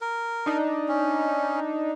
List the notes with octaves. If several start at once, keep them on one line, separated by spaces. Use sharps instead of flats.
A#4
D4 D#4
C#4